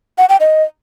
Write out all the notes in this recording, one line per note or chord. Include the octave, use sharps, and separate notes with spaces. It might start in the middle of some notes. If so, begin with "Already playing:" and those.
F#5
G5
D#5